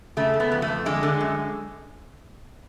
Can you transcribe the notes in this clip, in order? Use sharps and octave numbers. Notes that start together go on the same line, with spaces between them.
C#3 A3
C#3
B3
F2
A3
F2
D3 G#3
D3
F#2